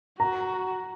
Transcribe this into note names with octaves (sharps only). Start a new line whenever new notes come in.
F#4 A#5